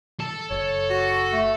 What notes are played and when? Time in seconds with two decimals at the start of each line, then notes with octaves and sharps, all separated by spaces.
0.20 A4 A5
0.51 F#1 C#5
0.90 F#4
1.33 A3